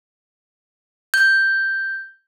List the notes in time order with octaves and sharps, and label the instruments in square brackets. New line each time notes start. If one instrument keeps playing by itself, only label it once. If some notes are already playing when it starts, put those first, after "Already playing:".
[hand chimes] G6